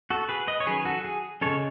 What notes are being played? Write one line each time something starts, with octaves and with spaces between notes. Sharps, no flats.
F#4 A4
G#4 B4
B4 D#5
C#5
D#3 F#3 C#4 G#4 B4
F#4 A4
G#4
C#3 G#3 C#4 A4 C#5